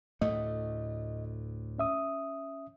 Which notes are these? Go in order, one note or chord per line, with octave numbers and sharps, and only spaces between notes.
D2 A2 A3 D#5
C#4 E5 D#6